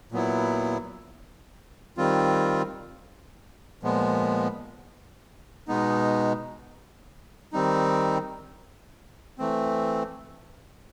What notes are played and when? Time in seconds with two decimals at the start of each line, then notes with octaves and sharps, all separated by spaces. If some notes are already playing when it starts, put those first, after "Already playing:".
0.12 A#2 F#3 B3 E4
1.97 D#3 G3 C4 F4
3.83 A#2 F3 G#3 B3
5.68 B2 G#3 B3 D#4
7.53 D#3 G3 C4 D#4
9.39 E3 A3 C4